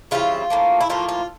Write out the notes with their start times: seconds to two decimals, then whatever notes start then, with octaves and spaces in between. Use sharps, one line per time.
0.11 C#3 E3 G3 C4 F4
0.50 A2 F3 A#3
0.81 E4
0.89 A2 F3 A#3 F4
1.09 F4